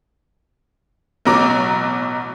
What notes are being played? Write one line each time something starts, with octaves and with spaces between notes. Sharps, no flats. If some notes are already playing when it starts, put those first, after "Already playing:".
A1 B2 F#3 A#5 D6